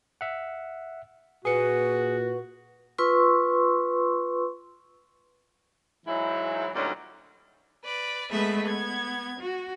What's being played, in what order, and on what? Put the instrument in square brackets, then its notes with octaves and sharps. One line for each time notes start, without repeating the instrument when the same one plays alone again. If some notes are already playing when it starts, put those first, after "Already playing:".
[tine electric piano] E5 F#5
[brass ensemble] A#2 F#4 [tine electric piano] G#4 C#7 [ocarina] B4
[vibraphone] F4 B4 C6 C#6 E6
[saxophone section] G#2 E3 F#3 D#4 E4
D2 A#2 F#3 G3 C#4 D#4
[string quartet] B4 D5
G#3 A3 B3 G#4 B4 E5
B3 G#6
F#4